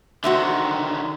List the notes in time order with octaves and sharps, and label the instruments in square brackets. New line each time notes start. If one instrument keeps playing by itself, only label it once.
[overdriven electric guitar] D3 D#3 [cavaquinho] F#4 C5 E5